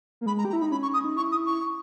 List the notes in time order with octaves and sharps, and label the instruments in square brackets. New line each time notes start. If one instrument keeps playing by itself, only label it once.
[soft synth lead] A#3
[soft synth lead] G#3 [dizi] B5
[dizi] A#5
[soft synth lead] G4
[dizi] A#5
[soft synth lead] E4
[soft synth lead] D#4 [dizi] B5
[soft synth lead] C#4 [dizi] B5
[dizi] C#6
D#6
[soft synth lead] D#4
[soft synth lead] E4 [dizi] C#6
[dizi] D#6
C#6